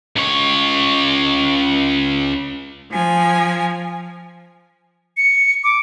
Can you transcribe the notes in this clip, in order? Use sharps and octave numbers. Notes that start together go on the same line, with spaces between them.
C#2 C#5
F3 G#5
C#7
D6